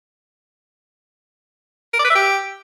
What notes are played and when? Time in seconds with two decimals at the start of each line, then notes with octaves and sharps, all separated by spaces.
1.94 A#4
1.99 D5
2.05 B4
2.10 E5
2.15 G4